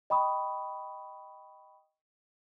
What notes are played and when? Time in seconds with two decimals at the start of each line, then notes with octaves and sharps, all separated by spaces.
0.10 D#5 G5 B5 C#6 D#6